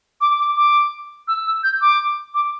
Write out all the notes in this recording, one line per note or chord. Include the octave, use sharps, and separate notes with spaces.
D6
D6
D6
E6
E6
G6
D6
D6